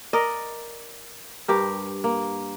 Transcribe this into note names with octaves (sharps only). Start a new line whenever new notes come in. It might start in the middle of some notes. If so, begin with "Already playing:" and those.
A#4 D5 D#5
G2 G4 A#4
A#3